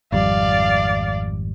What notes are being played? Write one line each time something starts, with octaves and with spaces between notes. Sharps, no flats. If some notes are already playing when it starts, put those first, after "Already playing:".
G#1 F2 G3 D5 F5